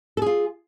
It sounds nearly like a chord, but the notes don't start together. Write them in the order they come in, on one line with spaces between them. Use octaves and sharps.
A4 G#4 F4